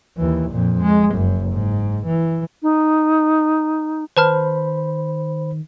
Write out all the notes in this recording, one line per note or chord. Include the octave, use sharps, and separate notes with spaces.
D#2 E3
F2 A#2
G#3
F#1 F#2
G#2
E3
D#4
D#3 B4 C5 A5 B5 F6